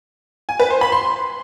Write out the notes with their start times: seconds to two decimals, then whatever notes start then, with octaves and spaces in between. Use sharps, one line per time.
0.49 G#5
0.60 B4
0.70 C5
0.81 B5
0.92 C6